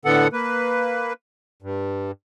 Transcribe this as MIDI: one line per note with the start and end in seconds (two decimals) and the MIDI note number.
0.05 0.28 45
0.05 0.28 50
0.05 0.28 59
0.05 0.28 69
0.05 0.28 78
0.33 1.13 58
0.33 1.13 71
1.62 2.11 43